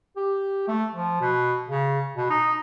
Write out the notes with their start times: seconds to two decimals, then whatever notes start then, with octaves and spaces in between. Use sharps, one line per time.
0.17 G4
0.68 A3
0.95 F3
1.21 B2
1.69 C#3
2.16 B2
2.30 D#4